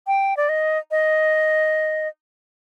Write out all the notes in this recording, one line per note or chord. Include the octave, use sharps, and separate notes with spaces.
G5
D5
D#5
D#5